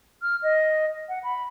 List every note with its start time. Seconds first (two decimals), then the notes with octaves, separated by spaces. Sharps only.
0.22 F6
0.43 D#5
1.09 F#5
1.23 B5